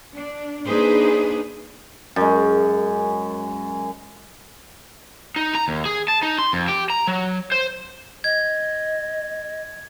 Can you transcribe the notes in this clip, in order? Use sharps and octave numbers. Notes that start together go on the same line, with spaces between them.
D4
A#3 D4 D#4 G#4 B4 C5
F#2 G#3
D#4
A#5
D#2
G#4
A5
D#4
C6
F2
G4
A#5
F#3
C5
D#5 G#6